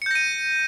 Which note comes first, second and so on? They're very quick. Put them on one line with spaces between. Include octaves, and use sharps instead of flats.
C#7 G6 A#6 D#7